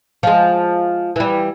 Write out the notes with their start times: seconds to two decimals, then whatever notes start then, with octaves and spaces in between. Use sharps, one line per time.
0.23 F3 G#3
1.16 E3 G3